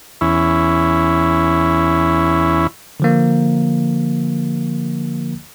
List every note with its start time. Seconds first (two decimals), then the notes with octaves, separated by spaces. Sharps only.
0.21 E2 C#4 E4
3.00 D3 F3 A#3